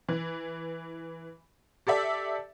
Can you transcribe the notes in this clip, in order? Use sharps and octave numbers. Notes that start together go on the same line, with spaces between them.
E3
G4 A4 D5 E5